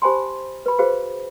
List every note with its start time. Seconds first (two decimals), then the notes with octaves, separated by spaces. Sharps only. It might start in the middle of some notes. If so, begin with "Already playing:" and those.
0.02 G4 C5 G#5 A5 B5 C6
0.66 B4 B5
0.79 F#4 G#4 B4 C5 F5